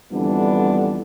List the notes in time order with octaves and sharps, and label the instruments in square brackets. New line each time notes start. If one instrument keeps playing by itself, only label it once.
[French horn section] F2 D3 E3 G3 B3 D4